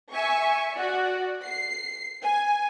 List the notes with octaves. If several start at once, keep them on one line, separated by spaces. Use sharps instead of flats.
E5 G#5 C#6
F#4 D5
C7
G#5